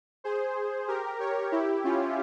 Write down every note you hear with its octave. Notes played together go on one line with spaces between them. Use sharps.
G#4 C5
G4 A#4
A#4 C#5
E4 G4
C#4 F4